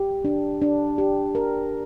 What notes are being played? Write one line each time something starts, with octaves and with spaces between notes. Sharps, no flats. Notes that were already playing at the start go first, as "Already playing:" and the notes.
Already playing: G4
D4
D4
G4
A#4